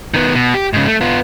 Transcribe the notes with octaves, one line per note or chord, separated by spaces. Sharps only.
D#3 B3
B2
G4
G#2 C#3
A3
B3 F4